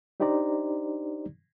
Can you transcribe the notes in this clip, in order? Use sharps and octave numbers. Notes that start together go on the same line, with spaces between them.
D4 D#4 G4 C5 D5 A#5